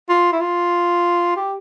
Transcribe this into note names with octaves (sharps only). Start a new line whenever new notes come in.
F4
E4
F4
G4